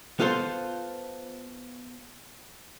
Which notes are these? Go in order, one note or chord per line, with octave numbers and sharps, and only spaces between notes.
B3 F4 A4 C5